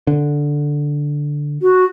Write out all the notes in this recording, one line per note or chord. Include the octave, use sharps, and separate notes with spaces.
D3
F#4